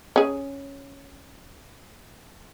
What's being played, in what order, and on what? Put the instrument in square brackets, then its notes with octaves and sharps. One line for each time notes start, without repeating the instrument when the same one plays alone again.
[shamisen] C#4 G#4